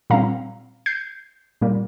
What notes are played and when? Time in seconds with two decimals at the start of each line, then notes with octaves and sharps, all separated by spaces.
0.10 A#2 G3 C4 F5 A#5
0.86 G6 C7
1.62 A#2 G3 A#3